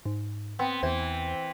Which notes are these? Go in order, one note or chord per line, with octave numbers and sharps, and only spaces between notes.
G#2
B3 C4
E2 E3 C5